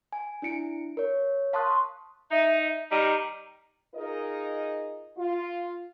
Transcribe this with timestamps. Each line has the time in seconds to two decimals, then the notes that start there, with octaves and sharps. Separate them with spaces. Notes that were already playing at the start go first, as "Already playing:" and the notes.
0.12 G#5
0.42 D4 E4 C#7 D7
0.97 A#4 C#5
1.53 F5 A5 C6 C#6 D#6 F#6
2.31 D#4 E5
2.90 D#3 G3 D#4 A#5
3.95 D#4 F4 G#4 A#4 D#5
5.18 F4